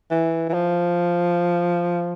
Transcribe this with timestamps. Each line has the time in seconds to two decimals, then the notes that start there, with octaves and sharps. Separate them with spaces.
0.11 E3
0.49 E3
0.54 F3